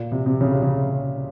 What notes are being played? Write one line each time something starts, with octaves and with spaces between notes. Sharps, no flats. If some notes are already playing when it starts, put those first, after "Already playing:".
Already playing: A#2
C3
C3
C#3
C3
C#3